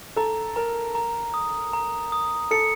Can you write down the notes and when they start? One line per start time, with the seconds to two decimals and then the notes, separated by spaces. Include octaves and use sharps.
0.16 A4 A#5
0.56 A#4 A#5
0.95 A#5
1.34 D#6
1.73 A#5
2.12 D#6
2.51 A4 C#7